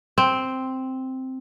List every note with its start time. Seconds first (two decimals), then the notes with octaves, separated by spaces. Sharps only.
0.18 C4